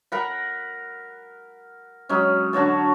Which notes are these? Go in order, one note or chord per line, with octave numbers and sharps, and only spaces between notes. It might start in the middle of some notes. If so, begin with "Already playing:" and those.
A#4 F#5 B5
F#3 G#3 C#4
D3 F#4 C#5 A5